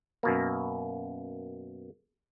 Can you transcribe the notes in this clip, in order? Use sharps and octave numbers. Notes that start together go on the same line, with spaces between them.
F#2 B2 A#3